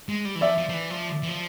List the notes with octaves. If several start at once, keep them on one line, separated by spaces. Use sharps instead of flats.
G#3
G3
E3
F3 D5 E5
F3
F3
E3
F3
E3
F3